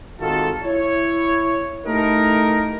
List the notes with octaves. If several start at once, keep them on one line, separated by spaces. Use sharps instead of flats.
G#1 D#3 F4 F#4 A4
E4 C#5
A3 D#4 E4 G4 A4 A#4